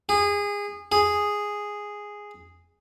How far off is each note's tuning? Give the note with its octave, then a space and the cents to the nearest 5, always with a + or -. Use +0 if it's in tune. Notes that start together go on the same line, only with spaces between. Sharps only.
G#4 -25
G#4 -5